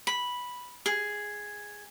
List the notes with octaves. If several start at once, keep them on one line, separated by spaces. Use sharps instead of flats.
B5
G#4